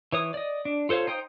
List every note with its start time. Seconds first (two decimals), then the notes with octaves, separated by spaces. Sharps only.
0.12 E3 C#5 D#6
0.34 D5 D#5
0.65 D4
0.89 F4 A4 C5 C#5 F5
1.07 D#4 C5 G5 D#6